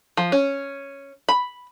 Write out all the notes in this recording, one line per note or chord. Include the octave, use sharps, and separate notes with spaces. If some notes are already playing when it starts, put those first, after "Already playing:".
F3
C#4
B5